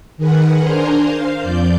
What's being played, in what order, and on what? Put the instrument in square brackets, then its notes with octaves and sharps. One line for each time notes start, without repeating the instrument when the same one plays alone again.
[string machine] D#3 G#4 A#4 B4 F#5
D4 A#4 C5 G#5 A#5 C6
C5 F5
F2 D5 G6